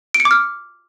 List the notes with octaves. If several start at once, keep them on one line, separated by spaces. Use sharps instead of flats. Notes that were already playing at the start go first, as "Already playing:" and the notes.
D7
C#7
D6
F6